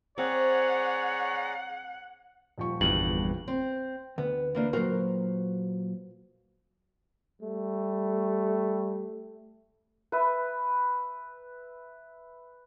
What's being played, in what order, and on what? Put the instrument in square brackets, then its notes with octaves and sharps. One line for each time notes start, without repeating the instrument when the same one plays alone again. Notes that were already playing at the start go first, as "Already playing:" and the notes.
[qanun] C4 [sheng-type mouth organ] G#4 D5 A#5 [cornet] C#5 [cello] F#5
[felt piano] D#1 F3 C#6
[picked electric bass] G1 E2 G2 [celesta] F#7
[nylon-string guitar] C4
[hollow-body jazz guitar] D2 [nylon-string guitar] B3
[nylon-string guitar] E3 A#3 D4
[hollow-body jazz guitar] A#2 F#3 [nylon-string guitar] F#4 A#4 C5
[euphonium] G3 [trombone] A3
[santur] B4 E5